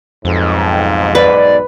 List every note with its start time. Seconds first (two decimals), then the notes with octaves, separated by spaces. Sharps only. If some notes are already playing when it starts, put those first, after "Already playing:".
0.25 B1 F2 G#2
1.15 B4 D5